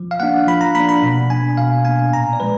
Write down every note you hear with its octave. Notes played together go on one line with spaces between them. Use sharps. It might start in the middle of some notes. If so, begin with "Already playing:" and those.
Already playing: F3
F5
A#3 D4 F#5
F3 B5
A#5
A#3 D4 B5
B5
B2
A#3 D4 G#5
B2 F5
A#3 D4 G#5
A#2 A#5
D5
F3 G#3 B4